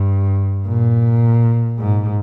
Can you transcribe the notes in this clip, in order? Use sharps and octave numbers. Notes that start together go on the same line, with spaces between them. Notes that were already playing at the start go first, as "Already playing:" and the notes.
Already playing: G2
A#2
G#2